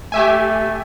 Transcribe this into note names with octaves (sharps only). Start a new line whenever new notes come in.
A3 G4 E5 G#5